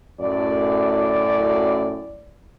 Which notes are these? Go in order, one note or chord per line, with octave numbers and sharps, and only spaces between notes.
F#2 A2 D5